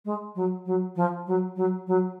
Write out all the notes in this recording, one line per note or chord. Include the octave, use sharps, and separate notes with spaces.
G#3
F#3
F#3
F3
F#3
F#3
F#3